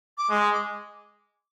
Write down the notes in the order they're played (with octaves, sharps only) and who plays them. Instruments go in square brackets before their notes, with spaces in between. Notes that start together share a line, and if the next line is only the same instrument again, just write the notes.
[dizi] D6
[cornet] G#3 [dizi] D#6
[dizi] D6